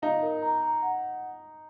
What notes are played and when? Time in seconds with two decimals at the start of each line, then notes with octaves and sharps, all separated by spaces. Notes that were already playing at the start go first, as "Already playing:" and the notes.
0.02 D#4 F5
0.22 A#4
0.42 A#5
0.63 A#5
0.82 F#5